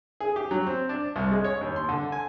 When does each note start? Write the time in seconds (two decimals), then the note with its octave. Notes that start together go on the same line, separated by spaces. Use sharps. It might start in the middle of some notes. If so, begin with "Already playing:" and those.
0.20 G#4
0.36 G4
0.51 F#3
0.67 C4
0.89 D4
1.16 C2
1.32 G#3
1.44 C#5
1.61 D#2
1.76 C6
1.89 D3
2.12 G#5